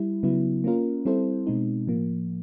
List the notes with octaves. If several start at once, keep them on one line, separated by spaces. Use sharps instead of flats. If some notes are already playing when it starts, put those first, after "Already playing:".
Already playing: G3 E4
C#3 F#3 B3 E4
A#3 C#4 F4 A#4
G3 C4 E4 A4 C5
B2 G#3 C4 D#4
A2 F3 A#3